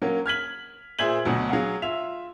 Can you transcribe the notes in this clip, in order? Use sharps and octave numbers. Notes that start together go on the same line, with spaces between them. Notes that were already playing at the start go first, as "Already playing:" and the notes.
F#3 A#3 C#4
F6 G#6 B6 F#7
A#2 G#4 C5 E5 G#6 F#7
D2 B2 F#3
F#3 G#4 F5 F#5
F4 E5 F7